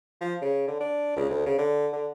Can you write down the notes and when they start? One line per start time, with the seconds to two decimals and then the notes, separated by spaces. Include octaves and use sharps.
0.21 F3
0.42 C#3
0.68 D3
0.80 D4
1.16 C#2
1.30 D2
1.46 C#3
1.58 D3
1.93 D3